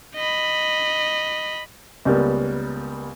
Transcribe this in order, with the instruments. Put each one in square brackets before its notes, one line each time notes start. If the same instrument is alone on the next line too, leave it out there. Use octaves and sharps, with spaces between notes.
[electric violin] D#5 B5
[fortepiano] C#2 G3 A#3 B3